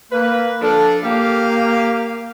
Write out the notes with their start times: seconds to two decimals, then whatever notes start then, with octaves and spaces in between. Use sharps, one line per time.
0.12 A#3 B4
0.62 F3 D4 A4
1.04 A#3 G4 F5